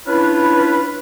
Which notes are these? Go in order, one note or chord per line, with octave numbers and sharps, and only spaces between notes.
C#4 D4 E4 F4 B4